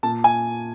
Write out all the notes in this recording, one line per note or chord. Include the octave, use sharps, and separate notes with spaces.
A#2 A5
G#5